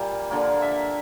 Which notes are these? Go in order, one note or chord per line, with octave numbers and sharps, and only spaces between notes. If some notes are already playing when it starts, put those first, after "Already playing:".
Already playing: A#2 G3 A#3
D3 F3 A#3 D5
E5